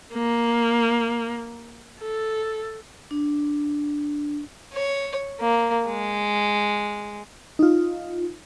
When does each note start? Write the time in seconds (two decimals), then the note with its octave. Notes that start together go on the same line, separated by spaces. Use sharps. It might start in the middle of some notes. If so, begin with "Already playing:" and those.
0.14 A#3
2.00 A4
3.11 D4
4.74 C#5
5.40 A#3
5.87 G#3
7.59 D#4 F4